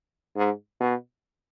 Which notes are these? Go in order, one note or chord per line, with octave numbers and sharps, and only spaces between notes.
G#2
B2